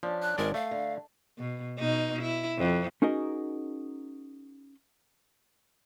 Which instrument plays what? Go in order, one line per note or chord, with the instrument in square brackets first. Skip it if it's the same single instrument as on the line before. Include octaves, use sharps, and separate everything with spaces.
[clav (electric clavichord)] F3 [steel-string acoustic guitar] C#4 D4
[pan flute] F#6
[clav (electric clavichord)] G#1 G#3 D5 [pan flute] A#4
[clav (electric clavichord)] A3 [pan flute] F5
[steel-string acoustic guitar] D3
[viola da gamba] B2
B2 D#4
E4
F2
[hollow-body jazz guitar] C#4 D#4 F#4 G#4 A#4 D#5